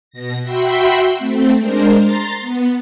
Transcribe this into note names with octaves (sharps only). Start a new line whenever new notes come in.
B2 A#6
F#4 E5 G5 B5 C6
A3 C4
G#3 D4 A#4 C5
A#5 C6 A6
B3